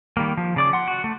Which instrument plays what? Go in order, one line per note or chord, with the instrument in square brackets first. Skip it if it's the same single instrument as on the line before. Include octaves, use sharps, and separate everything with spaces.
[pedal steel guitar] D#3 G3 A#3
F3
C#3 D5 D6
F#5 C6
F#4
A3